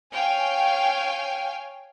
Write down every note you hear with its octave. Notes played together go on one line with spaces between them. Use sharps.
C#5 F5 G5 G#5